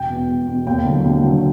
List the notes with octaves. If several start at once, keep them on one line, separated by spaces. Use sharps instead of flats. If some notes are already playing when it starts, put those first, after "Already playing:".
Already playing: E1 G5
E2 B2
E1
E2 B2
D#2 G5
D3 F#3
D#2
D3 F#3